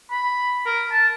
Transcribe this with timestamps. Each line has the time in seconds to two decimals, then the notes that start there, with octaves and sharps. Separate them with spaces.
0.11 B5
0.66 A#4
0.92 A5